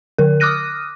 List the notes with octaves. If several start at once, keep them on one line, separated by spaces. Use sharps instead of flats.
D3 A#4
D6 D#6 F6 F#6 A#6 D#7